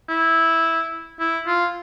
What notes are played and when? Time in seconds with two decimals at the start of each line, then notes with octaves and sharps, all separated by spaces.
0.09 E4
1.19 E4
1.47 F4